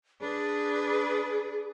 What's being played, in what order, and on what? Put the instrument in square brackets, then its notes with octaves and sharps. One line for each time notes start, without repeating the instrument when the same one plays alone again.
[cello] D4 B4 [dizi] G#4